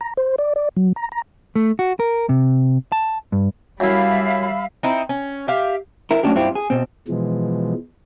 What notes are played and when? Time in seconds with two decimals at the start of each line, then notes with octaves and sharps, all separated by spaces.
0.01 A#5
0.17 C5
0.38 D5
0.56 D5
0.77 F#3
0.96 A#5
1.12 A#5
1.56 A3
1.79 F#4
2.00 A#4
2.29 C3
2.92 A5
3.32 G2
3.80 F#2 G3 E4 E5 F5 B5
4.83 C4 D#4 E4
5.09 C#4
5.48 G4 E5 F5
6.11 E4 A#4
6.23 F#3 A3 C#4 D4 E4 G4
6.35 G2 C4 E4 F4 G4
6.55 G#4
6.70 B2 C4
7.08 B2 E3 F3 G#3